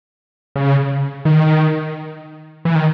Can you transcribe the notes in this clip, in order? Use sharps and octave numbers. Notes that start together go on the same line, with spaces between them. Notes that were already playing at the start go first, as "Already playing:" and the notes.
C#3
D#3
E3
D#3